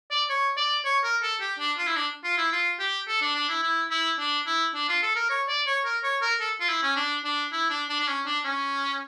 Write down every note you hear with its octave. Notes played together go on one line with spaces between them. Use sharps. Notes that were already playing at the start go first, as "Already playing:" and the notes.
D5
C#5
D5
C#5
A#4
A4
G4
D4
F4
E4
D4
F4
E4
F4
G4
A4
D4
D4
E4
E4
E4
D4
E4
D4
F4
A4
A#4
C#5
D5
C#5
A#4
C#5
A#4
A4
F4
E4
C#4
D4
D4
E4
D4
D4
D4
C#4
D4
C#4